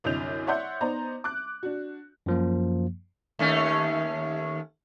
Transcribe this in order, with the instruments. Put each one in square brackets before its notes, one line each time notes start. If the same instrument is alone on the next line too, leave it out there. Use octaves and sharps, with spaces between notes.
[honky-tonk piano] C2 F#2 D3 D#5 G6 F7
C#5 D5 E5 F#5 C6 G6
B3 D#4 C5 D5 A#5
D6 F#6
D4 F#4
[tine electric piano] F#2 F3 A#3
[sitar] D#2 A3 C#4